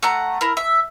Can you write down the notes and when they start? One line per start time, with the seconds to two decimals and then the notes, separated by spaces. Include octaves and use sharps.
0.03 A3 F#5 A#5 F#6
0.41 E4 A#4
0.57 E5